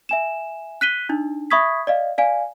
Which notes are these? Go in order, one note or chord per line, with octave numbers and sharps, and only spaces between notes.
E5 G#5 E7
F#6 B6 D#7 G7
D4 D#4
E5 B5 C#6 D#6 G#6 B6
D5 D#5 F5
D5 F5 G#5